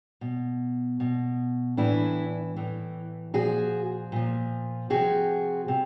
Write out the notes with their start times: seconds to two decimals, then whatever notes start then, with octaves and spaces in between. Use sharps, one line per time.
0.21 B2
1.00 B2
1.77 A2 E3 D4 E4
2.56 A2 E3
3.34 A#2 F3 F#4 G#4
4.12 A#2 F3
4.90 C3 F3 F#4 G#4
5.68 C3